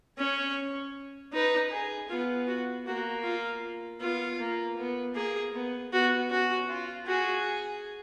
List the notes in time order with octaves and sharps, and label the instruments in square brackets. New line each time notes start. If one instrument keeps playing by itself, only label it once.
[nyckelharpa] C#4 [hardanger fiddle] C#5
[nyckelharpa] D#4 [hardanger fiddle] B4
[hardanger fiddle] G#4
[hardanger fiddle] B3 [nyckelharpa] F4
[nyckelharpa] F#4
[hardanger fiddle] A#3 [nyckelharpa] F#4
[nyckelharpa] F4
[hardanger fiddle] B3 [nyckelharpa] F4
[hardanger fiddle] A#3
B3
[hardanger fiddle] A#3 [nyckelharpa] G#4
[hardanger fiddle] B3
[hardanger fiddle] B3 [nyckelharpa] F#4
[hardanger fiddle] C#4 [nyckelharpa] F#4
[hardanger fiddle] F4
[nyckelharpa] F#4 [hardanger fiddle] G#4